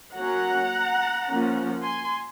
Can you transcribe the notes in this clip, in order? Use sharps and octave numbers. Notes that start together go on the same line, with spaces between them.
F#3 A#3 C#4 F#5 A#5
F3 A#3 C#4
G#5 C6